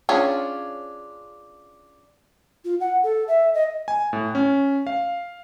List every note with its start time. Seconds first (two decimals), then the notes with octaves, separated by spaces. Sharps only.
0.09 C#4 D4 F4 G#4 C#5
2.65 F4
2.80 F#5
3.03 A4
3.28 E5
3.54 D#5
3.88 G#5
4.13 A2
4.35 C#4
4.87 F5